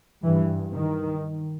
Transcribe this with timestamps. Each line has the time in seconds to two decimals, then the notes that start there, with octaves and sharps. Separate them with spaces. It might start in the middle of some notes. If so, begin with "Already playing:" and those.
0.24 G2 E3
0.76 D#3